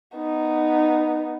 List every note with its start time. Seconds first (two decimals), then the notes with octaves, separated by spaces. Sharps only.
0.16 B3 D#4